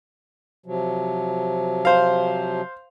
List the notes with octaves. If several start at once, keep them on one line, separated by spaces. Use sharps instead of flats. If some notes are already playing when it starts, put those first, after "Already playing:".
C3 F3 F#3
C5 F5